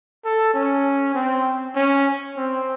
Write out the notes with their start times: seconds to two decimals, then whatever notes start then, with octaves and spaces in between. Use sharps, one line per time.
0.25 A4
0.54 C#4
1.15 C4
1.75 C#4
2.37 C4